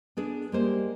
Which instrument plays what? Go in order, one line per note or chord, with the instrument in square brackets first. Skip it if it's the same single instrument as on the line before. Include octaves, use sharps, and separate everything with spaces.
[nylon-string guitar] B3 D4 G#4
[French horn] G3 [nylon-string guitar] G#3 A#3 C5